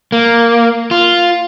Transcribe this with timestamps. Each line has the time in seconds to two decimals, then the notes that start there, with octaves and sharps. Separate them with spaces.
0.12 A#3
0.91 F4